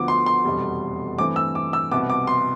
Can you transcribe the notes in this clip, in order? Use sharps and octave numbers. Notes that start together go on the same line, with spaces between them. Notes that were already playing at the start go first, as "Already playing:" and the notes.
Already playing: D2 D3 F3 B3 D6
C6
C6
F1 E2 B2 G3
G2 E3 A3 C4 D6
E6
D6
E6
C2 B2 B3 D6
D6
C6